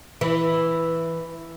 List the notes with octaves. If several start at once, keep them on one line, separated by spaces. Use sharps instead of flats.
E3